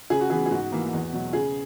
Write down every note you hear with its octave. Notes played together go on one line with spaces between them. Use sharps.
C#3 G#4
F#4
E3 B3 G#4
G#4
G#2 F#4
E3 A#3
E2
B2 F#3
C#3 G#4